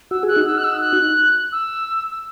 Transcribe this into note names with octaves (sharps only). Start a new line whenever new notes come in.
F#4 E6
G#4 F#6
D#4 F#4
E6
F#6
E6
F#6
E6